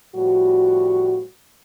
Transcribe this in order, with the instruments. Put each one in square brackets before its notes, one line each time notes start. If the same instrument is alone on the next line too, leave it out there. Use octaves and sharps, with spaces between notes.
[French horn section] A2 F3 G3 F#4